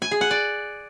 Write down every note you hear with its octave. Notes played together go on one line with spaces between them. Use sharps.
G#5
G#4
F#5
D5